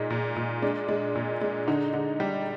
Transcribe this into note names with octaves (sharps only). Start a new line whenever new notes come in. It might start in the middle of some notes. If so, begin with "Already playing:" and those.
Already playing: A#2 G#3 D#4
A#2
A#2
G#3 D4
G#3
A#2
G#3
D3 D#4
D3
G3